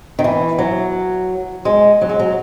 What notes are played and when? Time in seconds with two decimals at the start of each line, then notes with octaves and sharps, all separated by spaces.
0.19 D#3
0.24 E3
0.58 F#3
1.65 G#3
2.01 F#3
2.09 G#3
2.19 F#3